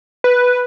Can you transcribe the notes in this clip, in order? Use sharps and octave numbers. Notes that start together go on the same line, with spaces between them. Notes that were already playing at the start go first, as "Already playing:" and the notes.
B4